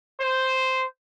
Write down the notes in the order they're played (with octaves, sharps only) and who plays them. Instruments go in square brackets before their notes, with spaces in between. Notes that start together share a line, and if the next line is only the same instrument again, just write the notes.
[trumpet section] C5